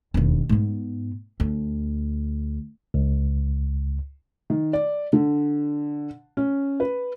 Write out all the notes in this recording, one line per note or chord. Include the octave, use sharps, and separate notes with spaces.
E1 D#2
G#2 B3
D2
C#2
D#3
D5
D3
C#4
B4